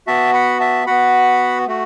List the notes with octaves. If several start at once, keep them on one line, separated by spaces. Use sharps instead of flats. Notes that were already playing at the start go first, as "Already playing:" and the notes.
B3 F#4 E5 A5
F#5 B5
E5 A5
B3 F#4 F#5 B5
A3 F#4